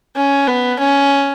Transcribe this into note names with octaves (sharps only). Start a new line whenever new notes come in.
C#4
B3
C#4